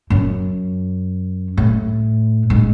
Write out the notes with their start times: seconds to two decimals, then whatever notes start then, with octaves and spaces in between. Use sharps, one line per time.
0.10 F#2
1.57 A2
2.50 G#2